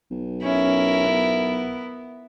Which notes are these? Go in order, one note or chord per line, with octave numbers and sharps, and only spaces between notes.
B1
C#4 E4 A#4
B3